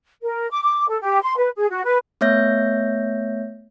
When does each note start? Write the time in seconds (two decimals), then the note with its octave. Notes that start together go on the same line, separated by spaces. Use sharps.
0.22 A#4
0.51 D6
0.63 D6
0.89 A4
1.01 G4
1.22 C6
1.37 B4
1.56 G#4
1.70 F#4
1.84 B4
2.21 A3 B3 C#5 E5 G6 A#6